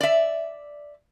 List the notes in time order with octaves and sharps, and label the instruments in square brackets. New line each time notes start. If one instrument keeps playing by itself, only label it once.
[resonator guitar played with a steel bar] D5 E5